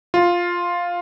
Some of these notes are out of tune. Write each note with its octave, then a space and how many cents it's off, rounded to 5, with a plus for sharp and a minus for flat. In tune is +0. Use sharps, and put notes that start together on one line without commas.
F4 +5